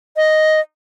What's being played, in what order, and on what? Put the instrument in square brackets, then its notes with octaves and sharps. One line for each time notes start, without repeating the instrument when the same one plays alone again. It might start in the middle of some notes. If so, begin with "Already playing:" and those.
[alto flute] D#5